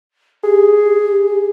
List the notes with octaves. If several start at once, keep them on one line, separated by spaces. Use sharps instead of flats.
G4 G#4